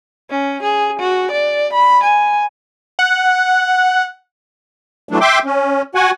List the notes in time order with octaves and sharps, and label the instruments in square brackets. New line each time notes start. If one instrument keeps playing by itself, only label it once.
[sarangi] C#4
G#4
F#4
D5
B5
G#5
[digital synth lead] F#5
[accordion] E3 F#3 A3 D4
E5 G5 C6 D6
C#4
F#4 F#5 G#5